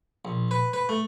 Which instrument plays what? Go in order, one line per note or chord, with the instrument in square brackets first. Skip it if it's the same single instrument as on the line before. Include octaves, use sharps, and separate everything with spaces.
[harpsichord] A#1
B4
B4
A3